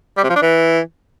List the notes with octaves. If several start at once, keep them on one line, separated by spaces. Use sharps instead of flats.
G3
C3
F3
D4
E3